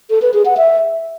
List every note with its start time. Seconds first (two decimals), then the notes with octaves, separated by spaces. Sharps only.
0.10 A4
0.22 B4
0.34 G#4
0.45 F#5
0.57 E5